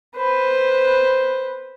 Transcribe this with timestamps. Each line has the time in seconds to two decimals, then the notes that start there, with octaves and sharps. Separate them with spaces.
0.16 B4 C5